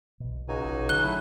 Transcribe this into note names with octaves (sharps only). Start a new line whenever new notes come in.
B1 B2
C#2 D#4 F#4 G#5
A#1
D3 F#3 F#6 G7
F#3 A3 C#4 E4